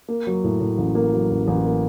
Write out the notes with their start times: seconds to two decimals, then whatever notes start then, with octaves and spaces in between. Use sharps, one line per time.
0.08 A#3
0.27 F#3
0.44 A2
0.61 A2
0.78 A1
0.95 A#3
1.13 F#3
1.31 A1
1.48 A1
1.65 A#3